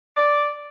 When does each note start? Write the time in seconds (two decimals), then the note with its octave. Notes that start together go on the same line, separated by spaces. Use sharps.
0.16 D5